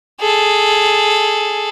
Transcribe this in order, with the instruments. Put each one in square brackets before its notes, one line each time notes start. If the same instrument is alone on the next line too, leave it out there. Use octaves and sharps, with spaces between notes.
[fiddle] G#4 A4